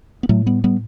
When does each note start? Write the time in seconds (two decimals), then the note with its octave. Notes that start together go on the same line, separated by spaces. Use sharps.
0.23 B3
0.29 A2 F#3 A3
0.46 G3 B3
0.64 G3 B3